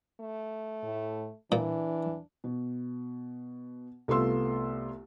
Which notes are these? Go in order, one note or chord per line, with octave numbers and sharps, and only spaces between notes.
A3
A2
A#2 E3 D4
B2
C2 A3 B3 F4 C6 E6